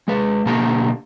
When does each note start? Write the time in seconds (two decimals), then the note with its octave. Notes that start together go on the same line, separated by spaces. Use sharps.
0.08 G#3 B4
0.46 B2 D3 A#3 G4 A5 A#5